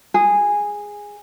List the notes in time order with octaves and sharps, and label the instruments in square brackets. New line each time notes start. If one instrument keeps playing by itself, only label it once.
[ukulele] G#4